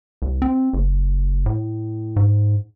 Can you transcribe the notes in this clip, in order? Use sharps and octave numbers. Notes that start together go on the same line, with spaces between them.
C2
C4
F#1
A2
G#2